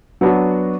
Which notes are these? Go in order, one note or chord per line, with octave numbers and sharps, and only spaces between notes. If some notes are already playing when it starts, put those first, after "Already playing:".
F#3 B3 D4 F#4